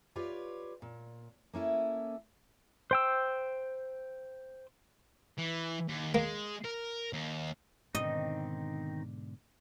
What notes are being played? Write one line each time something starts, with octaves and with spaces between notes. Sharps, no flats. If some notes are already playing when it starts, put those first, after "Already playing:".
F4 G4 B4 C#5 D5
A#2
A#3 C#4 E4 A4
C5 G5 E6
E3
D#2
G#3 A#3
A#4
D#2
G#2 B2 D3 D#3 C4 D#4 D#5